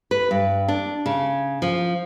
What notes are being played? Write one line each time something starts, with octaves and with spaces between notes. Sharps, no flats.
B4
G2
D4
C#3
F3